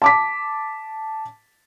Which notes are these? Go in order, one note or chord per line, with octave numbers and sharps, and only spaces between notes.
A5 D6 B6